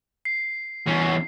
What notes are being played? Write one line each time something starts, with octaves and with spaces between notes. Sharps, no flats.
C7
E2 C#4